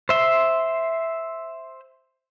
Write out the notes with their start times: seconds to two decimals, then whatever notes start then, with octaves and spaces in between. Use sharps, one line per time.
0.09 C5 E5 C6